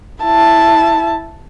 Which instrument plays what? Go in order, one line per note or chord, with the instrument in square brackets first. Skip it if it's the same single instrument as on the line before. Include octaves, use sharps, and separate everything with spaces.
[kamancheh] E4 A5